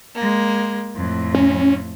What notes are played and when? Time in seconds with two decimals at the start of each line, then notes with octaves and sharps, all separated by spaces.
0.15 G#3 A#3
0.94 F2 A2
1.35 C#4